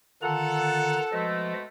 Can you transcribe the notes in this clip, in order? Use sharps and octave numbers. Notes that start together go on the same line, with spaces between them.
D3 D#3 F4 A4 F#5 A#5
B2 F3 G#3 A3 D#5